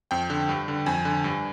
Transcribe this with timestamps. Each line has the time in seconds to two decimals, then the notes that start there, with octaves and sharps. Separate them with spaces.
0.11 F2 G5
0.30 D3
0.49 G2
0.68 D3
0.86 F2 G#5
1.05 D3
1.24 G2